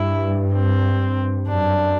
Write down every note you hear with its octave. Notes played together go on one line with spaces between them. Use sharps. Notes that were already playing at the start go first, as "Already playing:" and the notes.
Already playing: G2 E4
C4
F#2 D4